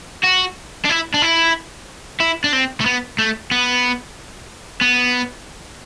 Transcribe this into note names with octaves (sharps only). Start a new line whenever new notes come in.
F#4
D4
E4
D4
E4
E4
D4
C4
A3
B3
A3
B3
B3